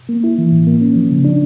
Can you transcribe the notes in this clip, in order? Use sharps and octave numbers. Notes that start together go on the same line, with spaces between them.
A#3
E4
E3
A2
A#3
C#4
F3
C#3
D4